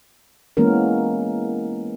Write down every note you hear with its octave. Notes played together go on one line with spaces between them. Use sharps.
E3 G#3 A#3 B3 C#4 A#4